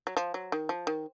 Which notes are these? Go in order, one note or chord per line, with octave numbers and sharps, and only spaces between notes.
F#3
F3
F#3
D#3
F3
D#3